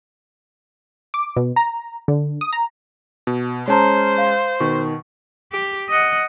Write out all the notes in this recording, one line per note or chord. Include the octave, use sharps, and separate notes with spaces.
D6
B2
A#5
D3
D#6
A#5
B2
G#3 C#4 C5 C#5 A5 A#5
F5
B2 D#3 C#6
G4
D#5 F#5